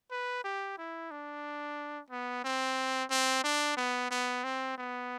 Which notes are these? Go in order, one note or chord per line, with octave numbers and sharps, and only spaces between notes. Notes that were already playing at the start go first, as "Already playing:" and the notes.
B4
G4
E4
D4
B3
C4
C4
D4
B3
B3
C4
B3